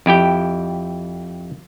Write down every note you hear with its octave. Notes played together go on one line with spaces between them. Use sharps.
F2 E4 G4 G5